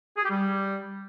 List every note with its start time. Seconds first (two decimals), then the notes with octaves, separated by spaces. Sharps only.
0.17 G#4
0.24 G4
0.30 G3